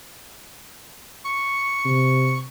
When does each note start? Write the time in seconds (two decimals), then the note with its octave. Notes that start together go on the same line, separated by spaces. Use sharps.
1.25 C#6
1.85 C3